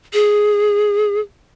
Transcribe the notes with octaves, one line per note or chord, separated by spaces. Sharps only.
G#4